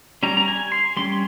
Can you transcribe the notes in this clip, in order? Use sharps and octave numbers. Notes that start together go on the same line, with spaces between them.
G3 C#4 A#5
A#5
G#5
C6
G3 C#4 C6